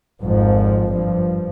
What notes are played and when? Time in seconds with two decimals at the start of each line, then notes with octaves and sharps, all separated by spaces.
0.22 G#1 F2 G#2 F3
0.92 G2 F3